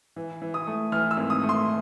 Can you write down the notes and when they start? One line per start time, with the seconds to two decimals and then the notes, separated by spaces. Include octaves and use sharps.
0.16 E3
0.42 E3
0.54 D#6
0.67 A3
0.92 E3 F6
1.11 E6
1.17 G#1
1.30 D#6
1.43 A3
1.49 C6